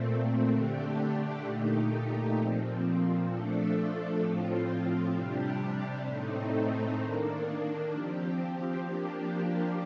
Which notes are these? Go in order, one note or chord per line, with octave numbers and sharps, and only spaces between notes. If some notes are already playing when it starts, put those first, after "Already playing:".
Already playing: A#2 A3 C4
D3 A3 D4 G4
A#2 A3 D#4 G4
A#2 F3 C4
F3 A3 D4 A4
A2 F3 C4 F4
C3 G3 D4 G4
A2 A3 C4 D#4
D#3 A#3 D4
F3 C4 G4
F3 A#3 D4 G4